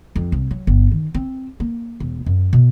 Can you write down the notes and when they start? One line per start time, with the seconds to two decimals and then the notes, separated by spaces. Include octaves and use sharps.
0.16 F2
0.32 C2
0.51 F#3
0.67 G1
0.91 D#3
1.14 C4
1.60 A#3
2.00 E1
2.26 F#2
2.53 B2